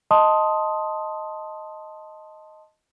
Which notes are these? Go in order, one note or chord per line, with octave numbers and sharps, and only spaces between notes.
D#5 A5 C6 D#6